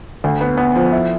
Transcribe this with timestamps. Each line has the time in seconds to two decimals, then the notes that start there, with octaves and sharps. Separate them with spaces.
0.24 D2
0.41 B3
0.58 B3
0.76 F3
0.92 E4